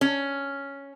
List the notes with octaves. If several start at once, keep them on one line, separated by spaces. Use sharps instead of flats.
C#4